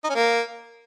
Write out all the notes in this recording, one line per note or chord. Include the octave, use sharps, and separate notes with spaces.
D#4
C#4
A#3